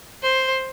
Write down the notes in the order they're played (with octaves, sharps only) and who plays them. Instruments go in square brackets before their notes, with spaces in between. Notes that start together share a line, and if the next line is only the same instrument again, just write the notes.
[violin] C5